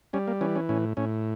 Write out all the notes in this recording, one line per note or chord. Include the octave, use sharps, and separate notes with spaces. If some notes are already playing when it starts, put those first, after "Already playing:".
G3 C#4
A#3
E3 C#4
C#4
A2 C#4
A2 C#4